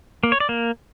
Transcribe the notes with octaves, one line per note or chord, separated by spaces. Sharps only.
A#3
C#5
D5
A#3